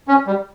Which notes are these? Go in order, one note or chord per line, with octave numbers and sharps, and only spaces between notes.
C#4
G3